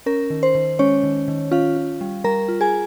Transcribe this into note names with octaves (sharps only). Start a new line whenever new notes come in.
C#4 A#4
D#3
C5
D#3
G#3 C#4 C#5
D#3
D#3
C#4 F4 F5
F4
G3
G3 A#4 A#5
F4
G#4 G#5